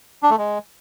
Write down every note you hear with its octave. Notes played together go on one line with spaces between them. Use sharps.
D4
A3
G#3